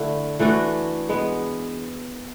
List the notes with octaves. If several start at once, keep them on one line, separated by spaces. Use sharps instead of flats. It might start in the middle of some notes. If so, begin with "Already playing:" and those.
Already playing: D3 A3 E4
E3 A3 D4 F#4
G#3 B3